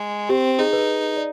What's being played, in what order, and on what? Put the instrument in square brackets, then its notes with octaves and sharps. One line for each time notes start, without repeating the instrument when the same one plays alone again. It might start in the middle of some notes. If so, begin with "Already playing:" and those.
Already playing: [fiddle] G#3
[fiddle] C4 [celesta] G4
[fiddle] D#4 [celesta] G#4
[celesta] B4
D5